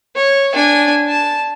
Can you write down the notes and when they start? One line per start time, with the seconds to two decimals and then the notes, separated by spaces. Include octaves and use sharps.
0.16 C#5
0.54 D4 G#5
1.08 A5